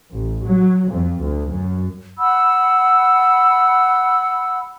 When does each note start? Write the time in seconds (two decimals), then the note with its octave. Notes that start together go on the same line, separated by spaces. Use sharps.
0.13 A1
0.46 F#3
0.93 F2
1.22 D2
1.51 F#2
2.19 F#5 B5 E6